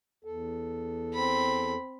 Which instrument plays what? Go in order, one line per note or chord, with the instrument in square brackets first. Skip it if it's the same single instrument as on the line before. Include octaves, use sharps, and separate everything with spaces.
[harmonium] E2 A4
[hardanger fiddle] C4 B5